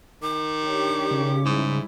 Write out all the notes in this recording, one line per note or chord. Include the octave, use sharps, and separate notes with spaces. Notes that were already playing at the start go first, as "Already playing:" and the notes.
D#3 D6
D4 G4 C#5
C#3
G#2 G3 E4